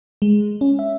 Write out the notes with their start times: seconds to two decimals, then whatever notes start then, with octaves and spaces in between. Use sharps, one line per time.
0.22 G#3
0.61 C#4
0.79 E5